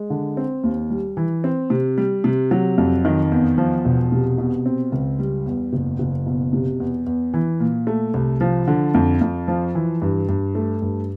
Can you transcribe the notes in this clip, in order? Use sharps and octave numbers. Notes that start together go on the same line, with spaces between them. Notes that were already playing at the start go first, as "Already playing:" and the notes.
Already playing: G#3
D3
C4
D#2
G3
E3
C4
C3
G3
C3
F#3
F2
D#3
E2
F3
E1
C3
B2
C4
C#2
G3
E2
F#1
F#1
B2
C3
E2
E2
E3
A#2
A3
C2
F3
D3
F2
F2
F3
E3
G2
G2
A3
G2